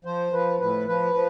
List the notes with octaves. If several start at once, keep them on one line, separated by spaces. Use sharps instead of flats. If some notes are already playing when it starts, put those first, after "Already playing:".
F3 C5
F3 B4
A2 B4
F3 B4
F3